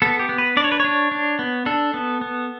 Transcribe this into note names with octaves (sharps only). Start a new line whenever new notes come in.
B3 A4
G4
B3
B4
D4 D5
C#5
B4
D4 C#5
D4
B3
D4 A4
B3
B3